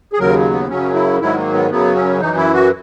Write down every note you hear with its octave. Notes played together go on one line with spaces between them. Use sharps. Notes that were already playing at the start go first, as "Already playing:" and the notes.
G#4
D#2 C#3 F#3 A#4
B3
F#2 C#3 F#3 C#4
E4
G#2 D#3 F#3 E4
A#3
B3
F#2 C#3 F#3 B3
C#4
F#2 E3 D#4
E4
F#4